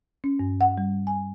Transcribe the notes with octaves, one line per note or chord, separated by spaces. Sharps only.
C#4
G2
F#5
G3
G#5